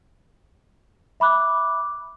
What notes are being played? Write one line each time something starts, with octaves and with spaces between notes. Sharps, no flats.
E5 B5 D6 F#6